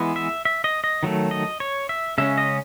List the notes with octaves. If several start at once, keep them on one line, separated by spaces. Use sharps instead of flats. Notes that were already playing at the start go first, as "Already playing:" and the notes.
Already playing: E3 G#3 B3
E5
E5
D#5
D#5
D#3 F#3 A3
D#5
C#5
E5
C#3 G#3 C#4 E5
D#5